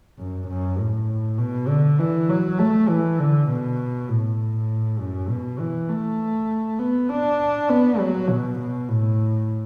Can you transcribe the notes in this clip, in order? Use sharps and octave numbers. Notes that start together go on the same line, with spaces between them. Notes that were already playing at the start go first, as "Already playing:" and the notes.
F#2
F#2
A2
B2
D3
E3
F#3
A3
E3
D3
B2
A2
F#2
B2
E3
A3
B3
D4
B3
F#3
B2
B2
A2